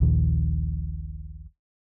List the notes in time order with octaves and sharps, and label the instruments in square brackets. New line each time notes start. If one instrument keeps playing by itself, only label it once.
[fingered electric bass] D#1 A#1 D#2 D#3